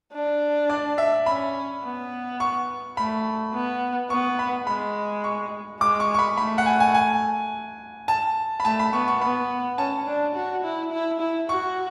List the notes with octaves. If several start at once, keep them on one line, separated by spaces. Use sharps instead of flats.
D4
D5
E5
C#4 B5
B3
C#6
A3 B5
B3
B3 C#6
B5
G#3 B5
C#6
G#3 D6
C#6
C#6
B5
A3 B5
F#5
G#5
G#5
G#5
A5
B5
A3 A5
B5
B3 C#6
C#6
B3 B5
C#4 A5
D4
F#4
E4
E4
E4
F#4 C#6